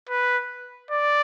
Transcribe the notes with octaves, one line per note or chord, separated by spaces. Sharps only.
B4
D5